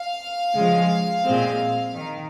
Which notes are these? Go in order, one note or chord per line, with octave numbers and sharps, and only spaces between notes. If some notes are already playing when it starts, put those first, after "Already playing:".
Already playing: F5
C#3 F3 G#3
A#2 G#3 C4
D#3